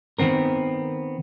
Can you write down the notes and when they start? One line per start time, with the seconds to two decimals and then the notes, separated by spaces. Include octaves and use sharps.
0.19 D#3 B3 C4 A#4